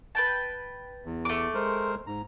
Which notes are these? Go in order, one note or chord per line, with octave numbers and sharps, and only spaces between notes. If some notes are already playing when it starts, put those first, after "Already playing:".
B4 G5 A5
E2
A3 D6
G#3 A#4 C5
G#2 A#5